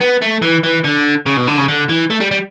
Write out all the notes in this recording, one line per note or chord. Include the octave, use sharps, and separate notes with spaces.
B3
A3
E3
E3
D3
C#3
B2
D3
C#3
D3
E3
A3
G3
G3